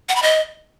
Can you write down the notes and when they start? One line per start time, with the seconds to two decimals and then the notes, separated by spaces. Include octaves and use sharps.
0.09 F#5
0.16 B5
0.22 D#5